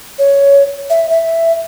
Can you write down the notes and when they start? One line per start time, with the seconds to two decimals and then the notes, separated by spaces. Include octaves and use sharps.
0.19 C#5
0.90 E5
1.10 E5